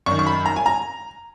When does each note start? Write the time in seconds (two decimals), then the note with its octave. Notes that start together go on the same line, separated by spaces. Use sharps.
0.06 F#2 D#3 C#6
0.19 C#6
0.26 B5
0.46 A#5
0.56 G#5
0.66 A#5